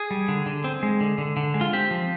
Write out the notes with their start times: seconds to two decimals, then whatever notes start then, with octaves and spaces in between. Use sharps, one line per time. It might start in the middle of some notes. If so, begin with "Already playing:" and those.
Already playing: G#4
0.11 G3
0.28 D3
0.46 D3
0.64 C4
0.83 G#3
1.01 D3
1.18 D3
1.37 D3
1.54 G#3
1.61 F4
1.73 C4 G4
1.91 F3